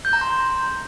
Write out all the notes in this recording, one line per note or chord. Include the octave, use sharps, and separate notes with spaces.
G6
A#5
C6